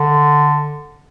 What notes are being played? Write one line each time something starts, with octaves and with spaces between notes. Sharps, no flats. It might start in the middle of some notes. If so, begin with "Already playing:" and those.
Already playing: D3